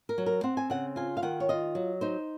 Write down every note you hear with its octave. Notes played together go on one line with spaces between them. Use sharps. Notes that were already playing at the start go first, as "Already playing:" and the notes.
A#4
F#3
A#4
C4 F#5
G#5
C#3 F#5
F4 G#5
F5
D#3 F#5
C#5
F4 D#5
F#3
D#4 C5